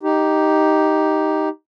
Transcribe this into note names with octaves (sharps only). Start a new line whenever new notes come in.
D#4 G4